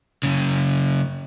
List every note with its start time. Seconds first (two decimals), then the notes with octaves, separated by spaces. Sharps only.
0.23 F#2 C#3